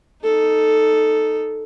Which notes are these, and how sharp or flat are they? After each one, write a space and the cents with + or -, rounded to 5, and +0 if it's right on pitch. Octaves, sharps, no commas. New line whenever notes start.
D#4 -5 A4 +0